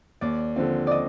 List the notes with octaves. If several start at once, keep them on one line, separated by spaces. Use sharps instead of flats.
D#2 D5
D3 F3 C4
D5 D#5